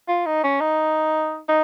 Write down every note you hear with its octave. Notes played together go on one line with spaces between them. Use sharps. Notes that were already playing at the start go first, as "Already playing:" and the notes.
F4
D#4
C#4
D#4
D#4